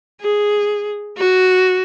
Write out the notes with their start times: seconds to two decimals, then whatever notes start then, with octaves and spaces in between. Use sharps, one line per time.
0.21 G#4
1.17 F#4